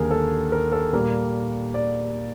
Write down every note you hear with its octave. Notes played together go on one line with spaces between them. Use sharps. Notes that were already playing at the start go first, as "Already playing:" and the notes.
Already playing: D#2 D3 G3 G#4 A#4
A4
A#4
A4
A#2 G3 A#3 A#4
D5